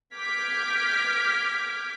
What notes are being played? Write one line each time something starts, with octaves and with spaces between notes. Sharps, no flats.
D6 F6 G6 G#6 B6 D7